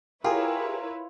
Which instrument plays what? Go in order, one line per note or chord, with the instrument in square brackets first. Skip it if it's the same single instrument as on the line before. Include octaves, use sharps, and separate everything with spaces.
[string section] E4 B4 C#5 [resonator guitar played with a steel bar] F4 [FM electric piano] G4 G#4 [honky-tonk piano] A#4